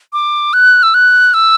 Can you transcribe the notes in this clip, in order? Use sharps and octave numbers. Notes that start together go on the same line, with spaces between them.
D6
F#6
E6
F#6
E6